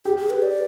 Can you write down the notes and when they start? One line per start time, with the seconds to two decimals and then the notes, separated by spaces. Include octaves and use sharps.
0.05 G4 G#4
0.18 G#4
0.30 B4
0.42 D5